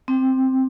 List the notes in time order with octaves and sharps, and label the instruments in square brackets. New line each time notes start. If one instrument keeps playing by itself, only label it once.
[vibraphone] C4